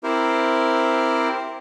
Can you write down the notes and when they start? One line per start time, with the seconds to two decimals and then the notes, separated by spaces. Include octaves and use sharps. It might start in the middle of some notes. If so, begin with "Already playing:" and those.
0.03 C4 E4 G4 A#4 C5